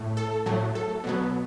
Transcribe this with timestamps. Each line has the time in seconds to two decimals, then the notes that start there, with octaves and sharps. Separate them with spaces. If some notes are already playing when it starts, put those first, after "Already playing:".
Already playing: A2 A3
0.17 A4
0.46 A2 F#3 A3
0.75 A4
1.04 B2 F#3 B3